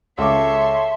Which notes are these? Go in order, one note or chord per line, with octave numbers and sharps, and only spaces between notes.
C#2 A4 C#5 E5 C6 D6